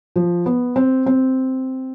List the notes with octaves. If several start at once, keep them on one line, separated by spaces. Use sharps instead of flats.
F3
B3
C4
C4